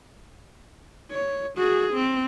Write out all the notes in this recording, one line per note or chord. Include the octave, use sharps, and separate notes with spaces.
C#5
F#4 G#4
C4